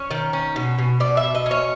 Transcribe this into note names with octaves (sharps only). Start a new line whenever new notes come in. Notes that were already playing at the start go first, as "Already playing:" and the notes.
Already playing: C#4 C#5
D#3
C#4
B2
B2
B2 D5
E5
B2
D#5
C#4
C#5